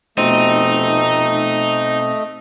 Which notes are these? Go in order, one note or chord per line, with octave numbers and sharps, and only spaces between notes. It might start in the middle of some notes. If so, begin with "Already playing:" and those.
F1 B2 A3 C4 D#4 D#5